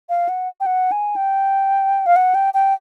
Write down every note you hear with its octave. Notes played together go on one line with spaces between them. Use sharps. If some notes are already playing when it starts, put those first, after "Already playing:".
F5
F#5
G5
F#5
G#5
G5
F5
F#5
G5
G5